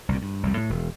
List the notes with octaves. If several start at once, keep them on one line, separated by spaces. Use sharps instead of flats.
C2 A#2
G2
C2 F2 G3
A2
E1